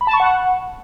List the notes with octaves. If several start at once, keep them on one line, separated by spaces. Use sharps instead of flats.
B5
A5
C#6
F#5